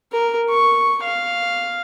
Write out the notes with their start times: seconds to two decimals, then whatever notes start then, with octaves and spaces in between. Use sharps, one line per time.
0.12 A#4
0.50 C#6
1.03 F5